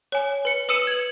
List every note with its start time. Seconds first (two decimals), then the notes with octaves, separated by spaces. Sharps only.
0.12 C#5 G#5
0.45 B4 C#7
0.69 B4 D#6 E6 C#7 D#7 E7
0.87 G#6 F#7